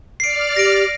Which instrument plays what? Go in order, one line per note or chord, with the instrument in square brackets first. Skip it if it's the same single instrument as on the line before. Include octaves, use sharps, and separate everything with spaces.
[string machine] D5 F6 [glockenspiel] C7 D7
[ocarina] G4 [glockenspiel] A#6 D7